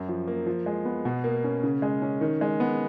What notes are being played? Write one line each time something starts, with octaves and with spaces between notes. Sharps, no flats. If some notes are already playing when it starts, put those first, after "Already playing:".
Already playing: F#2
F3
A#3
F3
G#3
B3
B2
A#3
C#4
C#3
G#3
C#4
D#3
G#3
B3